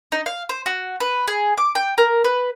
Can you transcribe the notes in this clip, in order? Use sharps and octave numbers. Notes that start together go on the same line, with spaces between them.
D#4
F5
C5
F#4
B4
G#4
D6
G5
A#4
B4